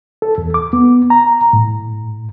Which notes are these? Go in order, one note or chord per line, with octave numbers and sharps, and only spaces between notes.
A4
E2
D6
B3
A#5
A2